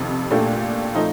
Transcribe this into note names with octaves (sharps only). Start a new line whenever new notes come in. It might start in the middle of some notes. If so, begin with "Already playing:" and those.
Already playing: F2 C3 D#3
A#2 A3 D4 G4
F3 A3 D#4